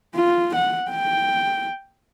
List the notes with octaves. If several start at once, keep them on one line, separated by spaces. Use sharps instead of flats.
F4
F#5
G5